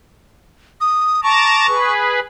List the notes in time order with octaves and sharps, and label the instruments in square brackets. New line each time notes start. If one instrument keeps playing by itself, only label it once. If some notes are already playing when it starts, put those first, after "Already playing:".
[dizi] D#6
[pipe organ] A5 A#5 D6 [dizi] C#6
[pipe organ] G#4 B4